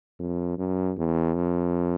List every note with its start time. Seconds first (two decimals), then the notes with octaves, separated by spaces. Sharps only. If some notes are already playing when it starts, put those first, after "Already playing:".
0.20 F2
0.58 F#2
0.98 E2
1.35 F2